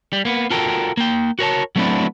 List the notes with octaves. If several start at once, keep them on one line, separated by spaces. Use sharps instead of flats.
G3
A#3 B3
F4 F#4 A4 A#4 G5
A#3 G5
F#4 A#4 C#5 A5
F#3 A3 B3 C4 D4 E4